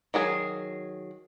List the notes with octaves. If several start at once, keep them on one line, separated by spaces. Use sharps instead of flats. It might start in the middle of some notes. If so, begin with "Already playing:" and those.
D#3 F#3 G#4